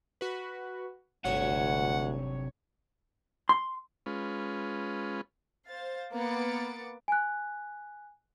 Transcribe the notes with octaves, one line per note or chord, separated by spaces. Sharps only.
F#4 B4
G1 D2 C3 F#3 C#5 F#5
C6
G#3 C#4 F4 B4
C5 F5 A6
A#3 B3 D6 A6 C#7
G#5 F#6